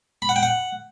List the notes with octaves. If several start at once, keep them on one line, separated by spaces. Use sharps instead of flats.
B5
F#5
G5
F#5